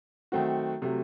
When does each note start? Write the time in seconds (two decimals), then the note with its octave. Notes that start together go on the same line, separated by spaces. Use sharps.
0.32 D#3 F#3 A3 C4 F#4
0.82 C3 F#3 A3